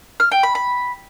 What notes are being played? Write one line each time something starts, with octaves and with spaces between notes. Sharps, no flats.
F6
G5
B5
B5